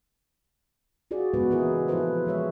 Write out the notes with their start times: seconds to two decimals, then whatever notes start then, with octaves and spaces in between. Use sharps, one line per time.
1.11 F4 F#4 G#4 D5
1.34 A#2 C#3 G#3 B3 F#4 B4
1.50 E3 A#3 E4 G#4 A#4
1.88 F3 E4 F4 A4 B4 C5
2.26 F3 G#3 C#5 E5